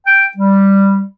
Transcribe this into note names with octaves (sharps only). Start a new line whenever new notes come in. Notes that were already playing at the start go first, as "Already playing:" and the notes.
G5
G3